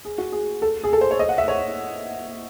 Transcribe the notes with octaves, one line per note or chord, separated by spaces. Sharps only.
G#4
F#4
G#4
A4
G#4
A4
C5
C#5
D#5
F#5
E5
C#5